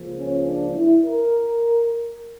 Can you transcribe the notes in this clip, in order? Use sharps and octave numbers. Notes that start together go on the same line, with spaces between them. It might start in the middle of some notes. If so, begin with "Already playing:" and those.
Already playing: C#2 C#3 F3 A#3
C#4
D4
E4
A#4